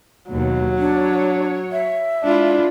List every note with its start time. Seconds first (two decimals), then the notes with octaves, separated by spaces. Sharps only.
0.31 D#2 B2 F#3
0.79 D4 C#5
1.72 E5
2.23 G#3 D4 E4 F4